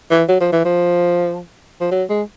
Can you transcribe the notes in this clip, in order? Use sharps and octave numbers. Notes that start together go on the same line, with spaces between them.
E3
F#3
F3
E3
F3
F3
F#3
G#3